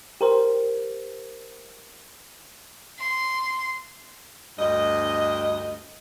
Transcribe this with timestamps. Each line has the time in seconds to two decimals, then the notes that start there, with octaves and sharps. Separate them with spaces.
0.21 G4 A#4 C5
2.99 C6
4.59 D2 G2 D#5